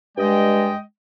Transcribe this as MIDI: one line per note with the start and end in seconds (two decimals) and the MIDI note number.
0.17 0.74 43
0.17 0.82 56
0.17 0.75 74
0.17 0.75 75
0.17 0.75 79